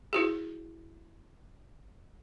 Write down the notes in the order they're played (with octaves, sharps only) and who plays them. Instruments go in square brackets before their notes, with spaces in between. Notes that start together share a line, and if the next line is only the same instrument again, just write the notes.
[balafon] E4 F#4 G#4